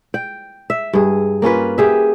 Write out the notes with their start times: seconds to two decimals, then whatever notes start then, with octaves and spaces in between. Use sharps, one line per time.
0.14 G5
0.70 E5
0.93 G2 G#4
1.42 A#3 C#4 F4 B4
1.78 G4 G#4 E5